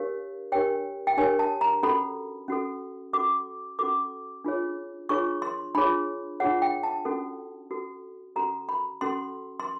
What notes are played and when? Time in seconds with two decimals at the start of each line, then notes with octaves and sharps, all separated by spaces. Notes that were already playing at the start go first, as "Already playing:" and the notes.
Already playing: D4 G4 A#4 C#5 F5
0.52 D4 G4 A#4 C#5 G5
1.07 G5
1.17 D4 G4 A#4 C#5 G#5
1.39 A5
1.61 A#5
1.83 C#4 F#4 A4 B5
2.48 C#4 F#4 A4
3.13 C#4 F#4 A4 D6
3.79 C#4 F#4 A4 D6
4.44 D4 F4 G#4 C#5
5.09 D4 F4 G#4 C#5 C#6
5.42 C6
5.74 D4 F4 G#4 C#5 B5
6.40 D4 F4 G#4 C#5 F#5
6.62 G5
6.83 A5
7.05 C#4 F#4 A4
7.70 C#4 F#4 A4
8.36 C#4 F#4 A4 A#5
8.69 B5
9.01 C#4 F#4 A4 C6
9.60 C6